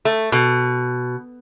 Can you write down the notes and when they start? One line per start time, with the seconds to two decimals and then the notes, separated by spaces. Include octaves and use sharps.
0.05 A3
0.32 B2